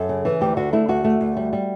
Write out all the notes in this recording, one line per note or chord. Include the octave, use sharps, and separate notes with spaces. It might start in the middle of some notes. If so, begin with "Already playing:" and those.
Already playing: F#2 A4
C#3
E3
D2 G4
D3 F#4
A3 E4
D2 F#4
A3
D2
G3
G3